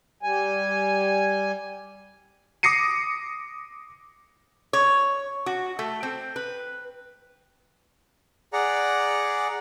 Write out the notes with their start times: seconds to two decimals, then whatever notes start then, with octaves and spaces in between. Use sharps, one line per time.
0.23 G3 G#5
2.63 D6 D#6 A#6 C7 C#7 D#7
4.73 C#5
5.46 F#4
5.79 A3
6.03 C4
6.36 B4
8.53 G#4 D5 F#5 A#5